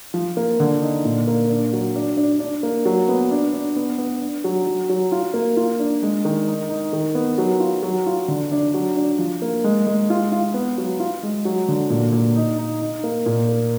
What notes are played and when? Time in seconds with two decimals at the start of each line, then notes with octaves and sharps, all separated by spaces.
0.14 F3
0.37 A#3
0.60 D3
0.82 D#4
1.05 A#2
1.28 A#3
1.49 D4
1.73 F#3
1.96 D4
2.17 D4
2.40 D4
2.63 A#3
2.85 F#3
3.09 B3
3.31 D4
3.53 D4
3.76 B3
3.98 B3
4.22 D4
4.44 F#3
4.67 F#3
4.89 F#3
5.12 F4
5.34 A#3
5.57 F4
5.79 D4
6.03 G#3
6.25 D#3
6.48 D#4
6.70 D#4
6.93 D#3
7.15 B3
7.38 F#3
7.60 F4
7.83 F#3
8.06 F4
8.28 D3
8.52 D4
8.74 F#3
8.96 D4
9.19 F3
9.42 A#3
9.64 G#3
9.87 G#3
10.10 F4
10.32 F4
10.54 B3
10.78 F#3
11.00 F4
11.23 G#3
11.45 F#3
11.68 D3
11.90 A#2
12.12 A#2
12.36 D#4
12.58 D#4
12.81 D#4
13.04 A#3
13.26 A#2
13.49 A#3